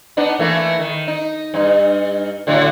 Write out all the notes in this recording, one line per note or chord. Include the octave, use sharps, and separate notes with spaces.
B3 D4 D#4
E3 A3 A#3
D#3
D#4
G2 D#4
A2 D3 F#3